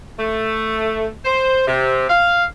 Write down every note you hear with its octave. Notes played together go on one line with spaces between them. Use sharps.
A3
C5
C3
F5